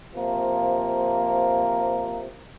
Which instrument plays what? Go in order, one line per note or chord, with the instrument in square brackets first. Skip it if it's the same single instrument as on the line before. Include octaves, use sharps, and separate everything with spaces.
[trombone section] C3 F3 A#3